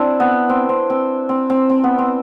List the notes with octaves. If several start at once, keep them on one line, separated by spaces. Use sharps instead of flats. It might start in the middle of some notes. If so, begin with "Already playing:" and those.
Already playing: C4 D4 E4
B3
C4
C4
C4
C4
C4
C4
B3
C4